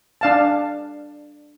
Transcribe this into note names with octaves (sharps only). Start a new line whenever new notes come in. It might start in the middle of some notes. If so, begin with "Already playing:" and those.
D4 F5 A5